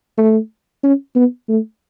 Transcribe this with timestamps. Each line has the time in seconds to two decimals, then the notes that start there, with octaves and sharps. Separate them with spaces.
0.18 A3
0.83 C#4
1.15 B3
1.49 A3